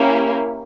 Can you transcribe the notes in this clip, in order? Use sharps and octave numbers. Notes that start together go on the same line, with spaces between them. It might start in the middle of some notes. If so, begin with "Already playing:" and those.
Already playing: A#3 C#4 E4 G4